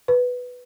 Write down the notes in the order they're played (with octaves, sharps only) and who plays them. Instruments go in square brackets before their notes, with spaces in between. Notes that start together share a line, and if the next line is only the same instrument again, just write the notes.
[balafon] B4